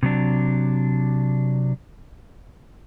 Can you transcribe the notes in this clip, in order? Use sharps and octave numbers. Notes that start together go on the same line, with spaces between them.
C3 F#3 D4